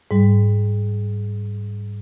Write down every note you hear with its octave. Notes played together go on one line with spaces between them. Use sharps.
G#2 G3